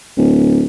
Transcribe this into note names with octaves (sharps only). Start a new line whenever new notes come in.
D1